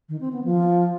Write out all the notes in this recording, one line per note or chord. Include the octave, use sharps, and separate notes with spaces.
D#3
C4
B3
F3